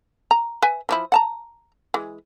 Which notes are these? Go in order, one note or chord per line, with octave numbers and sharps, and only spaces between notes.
A#5
B4 E5 G#5
E3 F3 E4
F#5 A5 A#5
E3 G#3